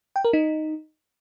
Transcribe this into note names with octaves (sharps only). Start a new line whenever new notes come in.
G5
A#4
D#4